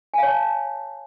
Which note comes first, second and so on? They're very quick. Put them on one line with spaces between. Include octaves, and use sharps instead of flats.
G#5 F5 C#5 A5